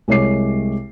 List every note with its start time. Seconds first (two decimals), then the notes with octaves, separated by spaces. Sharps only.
0.08 C2 G#3 C#5 D6 C7